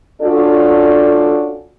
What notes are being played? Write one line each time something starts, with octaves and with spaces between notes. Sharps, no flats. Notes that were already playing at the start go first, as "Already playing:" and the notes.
C#4 D4 F4 F#4 A4 D5